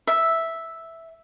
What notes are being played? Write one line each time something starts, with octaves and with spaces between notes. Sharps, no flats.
E5